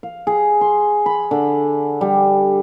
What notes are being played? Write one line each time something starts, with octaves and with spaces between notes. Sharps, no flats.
F5
G#4
C6
B5
D3
G3